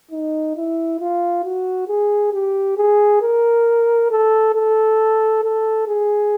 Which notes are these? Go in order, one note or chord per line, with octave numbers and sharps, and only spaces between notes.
D#4
E4
F4
F#4
G#4
G4
G#4
A#4
A4
A4
A4
G#4